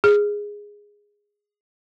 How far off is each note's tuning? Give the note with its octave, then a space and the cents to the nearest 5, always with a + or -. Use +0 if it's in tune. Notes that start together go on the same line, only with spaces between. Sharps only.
G#4 -10